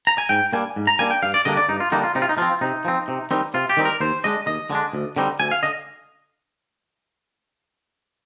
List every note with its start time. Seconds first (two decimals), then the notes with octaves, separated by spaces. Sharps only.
0.07 A#5
0.18 G#5
0.29 G#2 G5
0.52 G3 A#3 D4 G#5
0.76 G#2
0.87 A#5
0.99 G3 A#3 D4 G#5
1.11 G5
1.22 G2 F5
1.34 D5
1.45 D3 G3 A#3 D4 D#5
1.57 D5
1.69 G2 D#4
1.80 F4
1.92 D3 G3 A#3 D4 D#4
2.04 F4
2.15 C3 D#4
2.22 F4
2.29 D#4
2.38 F3 C4 F4
2.61 C3 D#4
2.85 F3 C4
3.08 C3
3.31 D#3 G3 C4 D#4
3.54 C3 F4
3.70 G4
3.77 D#3 G3 C4 D#4
3.85 A#4
4.00 D#2 C5
4.24 D3 G#3 D4 D#5
4.47 D#2 D#5
4.70 D3 G#3 D4
4.93 D2
5.16 D3 G3 C4 D#4
5.40 D2 G#5
5.51 F5
5.63 D3 D#5